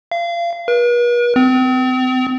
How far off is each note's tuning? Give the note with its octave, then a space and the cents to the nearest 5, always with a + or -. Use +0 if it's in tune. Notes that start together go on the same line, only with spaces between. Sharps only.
F5 -30
B4 -45
C4 -35